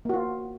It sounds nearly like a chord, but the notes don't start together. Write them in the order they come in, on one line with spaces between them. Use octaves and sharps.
A#3 F#4 F4